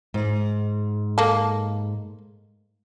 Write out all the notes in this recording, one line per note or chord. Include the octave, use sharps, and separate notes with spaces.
G#2
A#3 A4